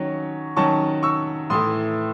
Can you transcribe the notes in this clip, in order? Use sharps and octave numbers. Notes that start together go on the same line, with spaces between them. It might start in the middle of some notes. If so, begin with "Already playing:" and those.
Already playing: D#3 F#3 C#4
D#3 F#3 C#4 A5 C#6
C#6 E6
A2 E3 A3 C6 D#6